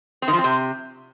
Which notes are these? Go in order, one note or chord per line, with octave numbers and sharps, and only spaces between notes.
C4
D#3
F3
C4
C3